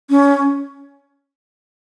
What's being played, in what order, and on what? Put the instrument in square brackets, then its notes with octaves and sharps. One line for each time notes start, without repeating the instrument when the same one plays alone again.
[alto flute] C#4